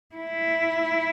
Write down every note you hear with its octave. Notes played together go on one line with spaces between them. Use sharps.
E4